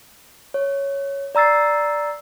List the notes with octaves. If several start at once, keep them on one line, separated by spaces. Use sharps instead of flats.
C#5
D5 A#5 E6 A6 C7